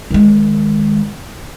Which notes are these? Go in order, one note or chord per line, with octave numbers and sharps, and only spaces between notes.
D#3 G#3